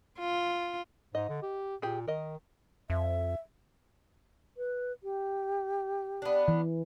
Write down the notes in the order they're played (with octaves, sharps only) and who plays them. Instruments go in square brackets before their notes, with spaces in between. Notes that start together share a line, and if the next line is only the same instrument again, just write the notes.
[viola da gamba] F4
[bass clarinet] G#2 [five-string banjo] D#5
[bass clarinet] D3
G4
[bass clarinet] A#2 [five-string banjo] G4 G#4
[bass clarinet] D#3 [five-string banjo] A#4 D#5
[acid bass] F2 [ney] E5
[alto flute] B4
G4
[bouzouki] B3 D4
[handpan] E3